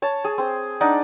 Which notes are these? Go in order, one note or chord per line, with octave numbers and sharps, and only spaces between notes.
C#5 A5
G#4
C4 C5
D4 D#4 D5 F#5